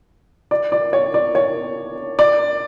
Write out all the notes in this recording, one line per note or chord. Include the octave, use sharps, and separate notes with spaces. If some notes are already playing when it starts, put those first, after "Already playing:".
D5
D5
C#5
D5
C#5
D5